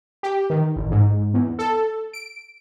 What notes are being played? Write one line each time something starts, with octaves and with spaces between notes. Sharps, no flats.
G4
D#3
A1
G#2
E2
A4
D7